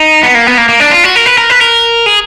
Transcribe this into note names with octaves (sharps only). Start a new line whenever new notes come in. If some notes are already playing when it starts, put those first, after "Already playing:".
Already playing: D#4
B3
A#3
B3
A#3
A#3
D4
F4
F#4
A#4
B4
A#4
B4
A#4
G#4